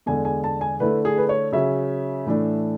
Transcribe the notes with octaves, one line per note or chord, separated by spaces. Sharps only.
E2 D3 G#3 G#5
G#5
A5
G#5
D3 A3 E4 B4
G#4
B4
C#5
C#3 F#3 C#4 E5
A2 E3 A3 D4